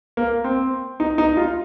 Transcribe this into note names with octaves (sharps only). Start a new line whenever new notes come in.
A#3
C4
D#4
D#4
F4